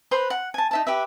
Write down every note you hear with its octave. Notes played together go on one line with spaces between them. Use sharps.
B4 C5 A#5 C6
F#5
G#5 A5
D#4 E5 A5
G4 B4 E5